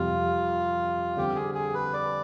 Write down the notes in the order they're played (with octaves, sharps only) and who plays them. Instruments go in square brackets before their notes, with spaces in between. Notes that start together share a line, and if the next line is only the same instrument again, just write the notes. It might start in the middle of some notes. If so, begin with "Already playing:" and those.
Already playing: [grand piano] F2 C3 G3 [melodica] F4
[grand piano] D3 G3 C4 [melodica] G4
[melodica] G#4
G#4
B4
D5